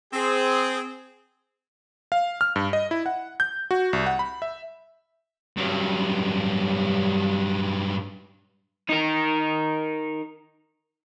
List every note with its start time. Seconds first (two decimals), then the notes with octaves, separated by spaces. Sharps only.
0.13 C4 G#4
2.12 F5
2.41 F6
2.56 G2
2.73 D#5
2.91 E4
3.06 F#5
3.40 G6
3.71 F#4
3.93 C2
4.06 F#5
4.19 B5
4.42 E5
5.57 G2 F#3
8.89 D#4 A#4